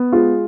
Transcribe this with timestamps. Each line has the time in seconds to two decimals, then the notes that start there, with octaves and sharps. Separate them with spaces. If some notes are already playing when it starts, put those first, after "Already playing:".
Already playing: B3
0.12 G#3 F4